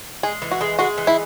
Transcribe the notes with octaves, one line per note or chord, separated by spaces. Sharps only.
G#3 G#4
E3
F#4
G#3
G#3 F#4
E3
E4